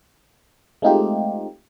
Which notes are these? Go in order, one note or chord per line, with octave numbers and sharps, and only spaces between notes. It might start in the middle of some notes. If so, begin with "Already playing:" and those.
G#3 A3 C4 D#4 F4 G4